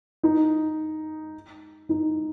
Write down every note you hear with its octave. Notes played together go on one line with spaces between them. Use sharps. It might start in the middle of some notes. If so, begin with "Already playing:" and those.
D#4
D#4